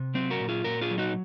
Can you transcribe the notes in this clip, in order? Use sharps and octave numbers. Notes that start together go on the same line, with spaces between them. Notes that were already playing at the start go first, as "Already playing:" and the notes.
Already playing: C3
F#3 C4
F#4 A#4
A#2
F4 G#4
A#2 F#4 A#4
F4 G#4
F#3
D#4 F#4